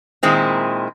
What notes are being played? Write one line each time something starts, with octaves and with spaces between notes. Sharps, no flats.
A#2 D#3 G#3 C4 E4